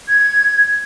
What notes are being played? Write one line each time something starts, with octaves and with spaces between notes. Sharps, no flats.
G#6